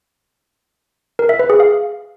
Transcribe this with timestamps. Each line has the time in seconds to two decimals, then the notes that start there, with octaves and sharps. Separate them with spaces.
1.19 A#4
1.29 E5
1.39 B4
1.50 G#4
1.60 F5